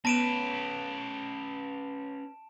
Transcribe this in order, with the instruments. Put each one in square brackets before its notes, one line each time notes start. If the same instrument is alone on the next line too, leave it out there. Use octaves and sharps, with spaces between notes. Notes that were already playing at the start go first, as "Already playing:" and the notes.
[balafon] B3 [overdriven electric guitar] C#4 B4 [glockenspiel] A5 D7 E7